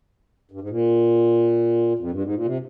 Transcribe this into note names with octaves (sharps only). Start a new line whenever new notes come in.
G2
G#2
A#2
F2
G2
G#2
A#2
C3